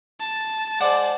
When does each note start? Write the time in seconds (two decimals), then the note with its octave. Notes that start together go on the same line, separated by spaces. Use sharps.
0.20 A5
0.81 G#3 C5 D5 F#5